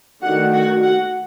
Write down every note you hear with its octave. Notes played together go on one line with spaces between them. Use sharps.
D#3 A3 D4 F#4 F#5
F#4 F#5
F#4 F#5